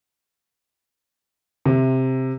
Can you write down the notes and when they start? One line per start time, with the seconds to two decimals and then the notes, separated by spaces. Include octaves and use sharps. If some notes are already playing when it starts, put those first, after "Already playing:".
1.66 C3